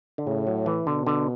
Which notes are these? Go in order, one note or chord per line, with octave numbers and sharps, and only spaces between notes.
D3
A2 C#3
F#3
E3
B2 D3
D3